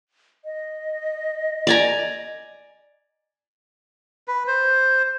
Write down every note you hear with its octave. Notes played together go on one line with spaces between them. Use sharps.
D#5
D5 G#5 A#5
B4
C5